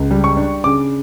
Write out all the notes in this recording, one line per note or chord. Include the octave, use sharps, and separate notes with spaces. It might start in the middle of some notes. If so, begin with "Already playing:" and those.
Already playing: C#2
G3
C#6
D4
C#3 D6